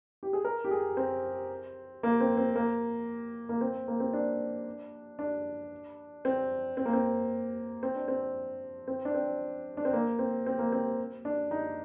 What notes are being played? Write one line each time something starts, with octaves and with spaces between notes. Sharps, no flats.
G4
G#4
A#4
G4
G#4
C4
A#3
C4
C4
A#3
A#3
C4
A#3
C4
D4
D4
C4
C4
A#3
C4
C4
D4
C4
C4
D4
C4
D4
C4
A#3
C4
C4
A#3
C4
D4
D#4